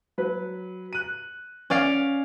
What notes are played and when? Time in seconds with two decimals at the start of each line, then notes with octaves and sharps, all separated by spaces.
0.18 F#3 B4
0.93 F#6 D#7
1.70 C#4 D5 F5